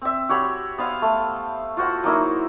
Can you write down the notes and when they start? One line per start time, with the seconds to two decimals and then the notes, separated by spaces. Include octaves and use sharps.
0.02 C4 E5
0.29 F#4 G4 C#5 B5
0.78 B3 C5 F5 D#6
1.02 A3
1.77 F4 F#4 C5 F#5
2.04 F#3 A#3 D#4 E4